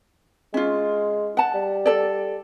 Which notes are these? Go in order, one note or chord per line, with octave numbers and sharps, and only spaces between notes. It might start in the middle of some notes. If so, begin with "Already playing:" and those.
G#3 C#4 F4
F#5 A5
G3
A4 D5